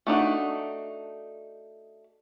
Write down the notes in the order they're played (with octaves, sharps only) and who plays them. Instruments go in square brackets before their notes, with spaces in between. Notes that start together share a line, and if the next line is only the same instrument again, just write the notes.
[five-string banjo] A3 D4 D#4 F#4